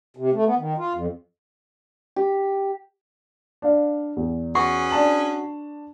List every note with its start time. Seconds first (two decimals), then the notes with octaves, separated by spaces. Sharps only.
0.17 C3
0.33 A3
0.46 B3
0.58 D#3
0.77 F4
0.93 F2
2.16 G4
3.62 D4 F5
4.17 E2
4.55 C#4 F#4 G#4 B4 C#6 C7
4.90 D4 A5 F#7